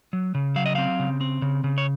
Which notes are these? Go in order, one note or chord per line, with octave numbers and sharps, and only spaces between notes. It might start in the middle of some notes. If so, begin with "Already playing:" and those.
F#3
C#3
F#3 F5
D#5
C4 F5
C#3
C4
C#3
C#3
C#5